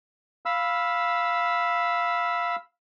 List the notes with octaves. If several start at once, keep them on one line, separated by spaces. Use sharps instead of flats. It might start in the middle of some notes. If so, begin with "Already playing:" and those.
F5 B5 E6